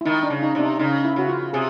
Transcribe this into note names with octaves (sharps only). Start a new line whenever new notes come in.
E4
D#3 D#4
D4
C#3
D#4
C3 D4
D#4
C#3 D#4
E4
C#3 F#4
F4
C3 G#4